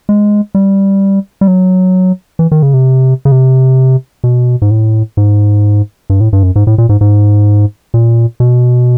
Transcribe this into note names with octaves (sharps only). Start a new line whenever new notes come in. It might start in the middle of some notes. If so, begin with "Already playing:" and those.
G#3
G3
G3
F#3
E3
D#3
C#3
C3
C#3
C3
B2
G#2
A2
G#2
G2
A2
G2
F#2
G#2
A2
A#2
G#2
G#2
A#2
B2